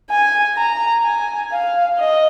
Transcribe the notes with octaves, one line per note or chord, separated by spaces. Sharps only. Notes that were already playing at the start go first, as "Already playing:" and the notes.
G#5
A#5
G#5
F5
D#5